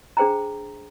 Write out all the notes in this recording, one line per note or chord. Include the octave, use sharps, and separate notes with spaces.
D4 G#4 C5 G5 A#5